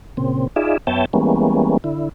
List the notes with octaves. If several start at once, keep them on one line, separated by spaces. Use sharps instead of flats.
A#2 C#3 C4
D#4 F4 G#4 D5 E5
F#2 B3 C#5 E5 G5 A5
E3 G3 G#3 A#3 B3 C#4
D3 E4